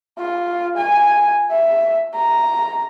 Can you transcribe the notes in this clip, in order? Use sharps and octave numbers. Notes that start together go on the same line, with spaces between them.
F4
G#5
E5
A#5